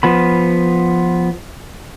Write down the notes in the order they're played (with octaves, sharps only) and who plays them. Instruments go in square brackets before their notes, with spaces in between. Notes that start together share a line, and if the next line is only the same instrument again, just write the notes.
[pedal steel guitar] F3 B3 B5